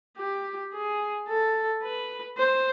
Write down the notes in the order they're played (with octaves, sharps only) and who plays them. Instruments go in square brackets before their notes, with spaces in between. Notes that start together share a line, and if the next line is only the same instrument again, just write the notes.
[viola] G4
G#4
A4
B4
C5